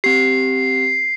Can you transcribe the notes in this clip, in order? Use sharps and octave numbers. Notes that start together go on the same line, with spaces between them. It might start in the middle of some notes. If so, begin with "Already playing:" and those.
C4 G4 C7